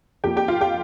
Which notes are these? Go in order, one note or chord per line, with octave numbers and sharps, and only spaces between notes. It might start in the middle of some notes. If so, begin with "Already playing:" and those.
F2 F3 A#3 G4 G5
G4 G5
F4 F5
G4 G5